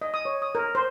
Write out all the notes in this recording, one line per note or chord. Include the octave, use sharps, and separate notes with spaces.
D#5
D#6
C#5
D#6
A#4
C5